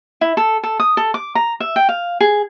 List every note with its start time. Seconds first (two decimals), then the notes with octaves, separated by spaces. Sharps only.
0.21 E4
0.37 A4
0.63 A4
0.80 D#6
0.97 A4
1.14 D6
1.35 A#5
1.60 E5
1.76 G5
1.89 F5
2.21 G#4